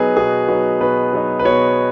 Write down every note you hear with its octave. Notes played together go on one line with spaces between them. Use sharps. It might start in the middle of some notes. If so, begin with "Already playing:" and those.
Already playing: B2 F#3 B3 D#4 G#4 B4
B2 G#4
F#3 B3 D#4
B2 B4
F#3 B3 D#4
B4
B2 C#5